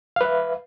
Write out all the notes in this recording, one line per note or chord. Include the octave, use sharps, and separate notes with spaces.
B4 E5 F5